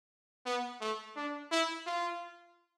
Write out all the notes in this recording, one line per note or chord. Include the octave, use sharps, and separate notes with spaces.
B3
A3
D4
E4
F4